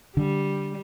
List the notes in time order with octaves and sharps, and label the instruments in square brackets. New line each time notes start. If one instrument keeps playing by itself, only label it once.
[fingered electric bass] D3 [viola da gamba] G3